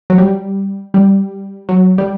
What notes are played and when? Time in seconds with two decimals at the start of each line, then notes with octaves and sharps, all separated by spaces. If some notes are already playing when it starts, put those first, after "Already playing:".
0.10 F#3
0.18 G3
0.94 G3
1.69 F#3
1.98 G3